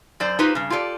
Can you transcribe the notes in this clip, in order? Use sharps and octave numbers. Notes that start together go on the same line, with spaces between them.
F#2 C5 D5
D#4 F4 G4 B4 C5
G2 C#3
F4 G4 A4 D5